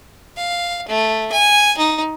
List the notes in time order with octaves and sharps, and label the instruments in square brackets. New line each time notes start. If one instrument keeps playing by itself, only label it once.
[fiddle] F5
A3
G#5
D#4